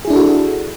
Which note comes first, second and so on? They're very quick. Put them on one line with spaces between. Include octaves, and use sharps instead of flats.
G#4 E4 D4 A4 F#4